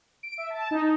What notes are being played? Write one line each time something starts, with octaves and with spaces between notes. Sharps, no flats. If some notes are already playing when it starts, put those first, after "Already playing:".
D7
E5
A5
D#4